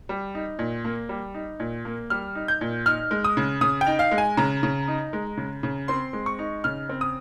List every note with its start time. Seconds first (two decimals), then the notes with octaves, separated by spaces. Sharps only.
0.09 G3
0.35 D#4
0.59 A#2
0.85 A#3
1.09 G3
1.34 D#4
1.60 A#2
1.85 A#3
2.10 G3 F6
2.35 D#4
2.48 G6
2.61 A#2
2.86 D#4 F6
3.11 G#3
3.24 D#6
3.37 C#3
3.61 C#3 D#6
3.81 G5
3.87 D#4
3.99 F5
4.11 G#3
4.18 G#5
4.37 C#3 A#5
4.63 C#3
4.88 D#4
5.13 G#3
5.37 C#3
5.63 C#3
5.88 C4 C6
6.13 G#3
6.26 C#6
6.39 D#4
6.64 C#3 F6
6.89 C4
7.01 D#6